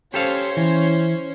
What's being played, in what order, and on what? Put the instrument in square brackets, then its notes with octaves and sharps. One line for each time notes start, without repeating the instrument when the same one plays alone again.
[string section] C#4 C5 C#5 [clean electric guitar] G4 A4 F5
[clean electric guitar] E3